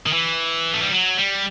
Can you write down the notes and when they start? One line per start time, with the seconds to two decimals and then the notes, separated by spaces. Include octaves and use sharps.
0.06 D#3
0.13 E3
0.73 A3
0.82 G3
0.91 F#3
1.17 G3